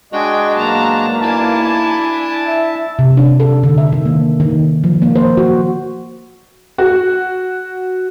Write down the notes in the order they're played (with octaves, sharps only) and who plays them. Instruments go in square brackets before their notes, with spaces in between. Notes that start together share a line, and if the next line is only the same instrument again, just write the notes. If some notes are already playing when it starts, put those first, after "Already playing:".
[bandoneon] G#3 D4 F#4 [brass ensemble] D#5 [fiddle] G5 G#5
[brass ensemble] B1 A#3 [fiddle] A5 A#5
[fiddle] D4 G#5 [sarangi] E4 [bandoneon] A5
[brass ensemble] E5
[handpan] C3
D4
A4
D3
E5
D#3
A#3
D#3
F3
A#3
C5
F#4
[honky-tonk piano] F#4